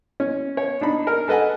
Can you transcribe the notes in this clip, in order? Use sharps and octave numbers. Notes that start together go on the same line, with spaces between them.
C#4
C#5
D4 D#4 B5
A#4
A4 B4 D#5 F#5 G#5